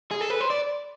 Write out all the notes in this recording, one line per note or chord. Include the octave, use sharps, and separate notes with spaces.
G#4
A4
B4
C5
D5